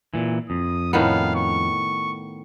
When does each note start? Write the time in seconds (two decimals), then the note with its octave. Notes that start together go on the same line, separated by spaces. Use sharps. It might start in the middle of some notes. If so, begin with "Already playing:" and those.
0.14 A#2 E3
0.50 F2 D#6
0.93 A2 D#3 B3 F5
1.35 C#6